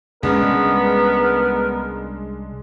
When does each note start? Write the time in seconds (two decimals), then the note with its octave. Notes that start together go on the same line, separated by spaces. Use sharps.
0.23 C2 G#3 B3 C#4 D4 A#4